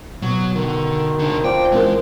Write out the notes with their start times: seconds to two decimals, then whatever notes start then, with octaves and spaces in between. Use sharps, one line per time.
0.22 B2 F#3
0.56 D3 D#3
1.19 C#2 D3
1.44 F3 D5 G5
1.72 E3 G#3 C4 A#4